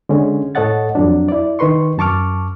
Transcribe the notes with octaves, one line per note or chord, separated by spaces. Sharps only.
D3 G#3 C#4
A2 A4 C#5 D#5 F#5 A6
F2 F#3 D4
E4 D5
D#3 D#4 B4 C6 C#6
F#2 A5 C#6 D6 F6